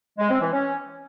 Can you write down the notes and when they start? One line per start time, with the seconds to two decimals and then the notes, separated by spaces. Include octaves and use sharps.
0.19 G#3
0.30 C4
0.41 E3
0.52 C#4